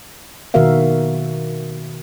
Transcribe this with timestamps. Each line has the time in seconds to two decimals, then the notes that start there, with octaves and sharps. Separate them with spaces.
0.54 B2 D#3 F#4 A#4 E5 F5